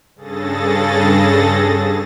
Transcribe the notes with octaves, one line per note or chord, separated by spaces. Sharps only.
G2 C#3 G#4 A4 A6 A#6